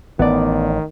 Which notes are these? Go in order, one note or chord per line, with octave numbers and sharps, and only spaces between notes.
A1 D#3 B3 D5